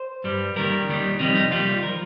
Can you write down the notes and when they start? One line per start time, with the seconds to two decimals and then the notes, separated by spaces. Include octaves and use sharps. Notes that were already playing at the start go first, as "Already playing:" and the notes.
Already playing: C5
0.24 G2 G3
0.56 D#2 D#3 G3 A#4
0.88 D#2 D#3 G3
1.19 F2 C3 D#3 G3 D#4
1.35 D#4
1.51 D#2 D#3 G3 F4
1.83 F3 A#4